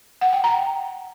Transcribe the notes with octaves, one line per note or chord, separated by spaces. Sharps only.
F#5
G5
A#5